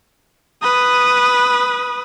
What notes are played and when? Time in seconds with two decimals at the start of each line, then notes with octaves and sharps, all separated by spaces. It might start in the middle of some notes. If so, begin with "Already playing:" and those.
0.63 B4 D#6